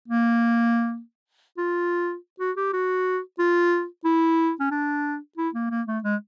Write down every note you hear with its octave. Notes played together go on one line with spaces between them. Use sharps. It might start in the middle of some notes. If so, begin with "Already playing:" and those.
A#3
F4
F#4
G4
F#4
F4
E4
C#4
D4
E4
A#3
A#3
A3
G#3